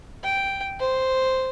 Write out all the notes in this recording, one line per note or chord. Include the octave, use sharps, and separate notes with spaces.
G5
C5